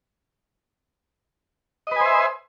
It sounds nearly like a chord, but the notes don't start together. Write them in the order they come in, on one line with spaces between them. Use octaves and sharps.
D#5 B4 G#5 C5 E5